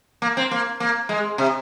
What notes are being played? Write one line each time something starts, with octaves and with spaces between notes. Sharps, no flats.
A#3
C4
A#3
A#3
G#3
C3